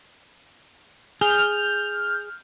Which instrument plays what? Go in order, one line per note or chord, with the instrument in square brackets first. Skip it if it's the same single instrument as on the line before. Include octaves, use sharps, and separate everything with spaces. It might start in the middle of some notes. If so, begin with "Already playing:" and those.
[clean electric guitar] G#4 [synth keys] F6 G6